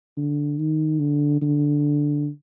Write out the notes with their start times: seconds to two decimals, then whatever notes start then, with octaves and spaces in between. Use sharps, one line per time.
0.17 D3
0.58 D#3
0.99 D3
1.42 D3